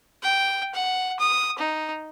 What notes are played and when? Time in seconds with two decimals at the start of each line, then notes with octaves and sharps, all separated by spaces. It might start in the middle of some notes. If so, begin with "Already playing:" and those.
0.23 G5
0.75 F#5
1.20 D#6
1.59 D#4